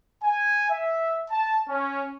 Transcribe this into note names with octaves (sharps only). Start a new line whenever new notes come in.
G#5
E5
A5
C#4